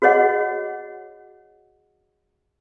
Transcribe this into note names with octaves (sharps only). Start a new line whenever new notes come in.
F#4 G#4 C#5 D#5 F#5